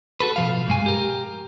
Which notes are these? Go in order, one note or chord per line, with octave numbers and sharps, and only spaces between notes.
F#4 A4 B4
B2 F3 F5
C2 G2 G#3 G#5
G4 A#4